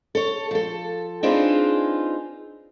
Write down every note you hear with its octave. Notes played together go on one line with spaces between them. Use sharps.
A4 C#5
F3 A4
C4 D4 D#4 F4 G#4 B4